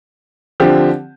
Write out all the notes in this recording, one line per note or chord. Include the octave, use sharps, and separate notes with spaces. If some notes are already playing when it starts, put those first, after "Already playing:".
D3 F3 C4 G4